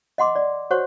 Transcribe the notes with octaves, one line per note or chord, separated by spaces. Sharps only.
D#5 F#5 C6 D6
D5
F#4 C5 C#5 F#5 C#6